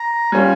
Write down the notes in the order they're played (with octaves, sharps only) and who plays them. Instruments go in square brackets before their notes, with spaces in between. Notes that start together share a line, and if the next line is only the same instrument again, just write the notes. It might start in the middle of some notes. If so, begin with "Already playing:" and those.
Already playing: [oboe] A#5
[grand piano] G3 C#4 F4 [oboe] G#5